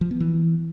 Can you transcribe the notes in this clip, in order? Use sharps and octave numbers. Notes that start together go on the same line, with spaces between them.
F3
B3
E3